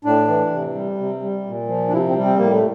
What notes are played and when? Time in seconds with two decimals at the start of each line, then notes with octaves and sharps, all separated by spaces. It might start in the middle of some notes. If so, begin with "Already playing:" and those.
0.05 A2 D4
0.28 E3
0.52 C3
0.75 G3
0.98 C3
1.22 G3
1.46 A#2
1.69 F3
1.88 D4
1.92 C3 E4
2.09 C4
2.17 G3
2.24 C4
2.38 A2 A#3
2.52 A3